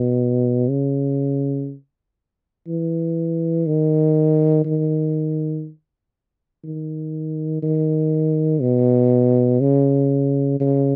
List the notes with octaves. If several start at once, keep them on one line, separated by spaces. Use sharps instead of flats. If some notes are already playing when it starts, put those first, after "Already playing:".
Already playing: B2
C#3
E3
D#3
D#3
D#3
D#3
B2
C#3
C#3